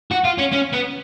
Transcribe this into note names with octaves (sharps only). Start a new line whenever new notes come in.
F#4
F4
C#4
C#4
B3